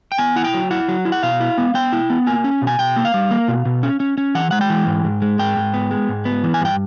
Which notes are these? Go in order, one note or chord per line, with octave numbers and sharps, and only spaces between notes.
G5
B3 G#5
E4 F#5
G5
F#3
E4 F#5
F#3
E4
F#5
B2 F5
E4
B3
B3 G5
E4
B3
A#3 G#5
C#4
B2
G#5
B2 G5
A#3
F5
G3
A#3
B2
B2
C#4
C#4
C#4
E3 F#5
G#3 F#5
G5
E3
G#2
G#2
G#3
G#2 G5
G#2
B3
G#3
G#2
B3
E3
G#5
G2 G5